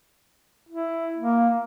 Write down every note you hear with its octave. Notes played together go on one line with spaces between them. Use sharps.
E4
A#3